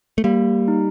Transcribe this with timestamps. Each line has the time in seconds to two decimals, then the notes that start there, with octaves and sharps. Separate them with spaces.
0.18 A3
0.24 G3 A#3
0.68 D#4